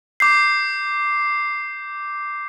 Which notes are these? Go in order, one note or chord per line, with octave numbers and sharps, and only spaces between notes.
D6 G6 C7